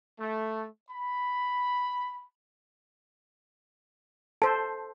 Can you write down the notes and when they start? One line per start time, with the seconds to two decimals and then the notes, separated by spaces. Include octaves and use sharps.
0.20 A3
0.91 B5
4.42 A4 C5 A5